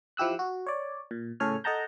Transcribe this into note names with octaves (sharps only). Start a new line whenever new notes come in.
F3 E4 G4 E6 F#6
F#4
C#5 D5
A#2
A2 C#3 A4 C#5 G#5 F6
A4 D#5 F#5 A5 A#5 G6